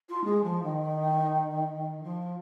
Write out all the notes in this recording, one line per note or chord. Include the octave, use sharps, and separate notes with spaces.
F4
G#3
F3
D#3
F3